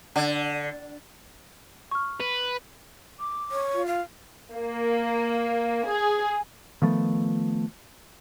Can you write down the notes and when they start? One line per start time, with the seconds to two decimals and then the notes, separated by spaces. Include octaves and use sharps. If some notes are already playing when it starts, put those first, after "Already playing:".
0.16 D3
1.91 C#6 F6
2.20 B4
3.19 D6
3.51 C#5
3.73 F4
3.86 F5
4.53 A#3
5.88 G#4
6.82 D#3 F3 A3 B3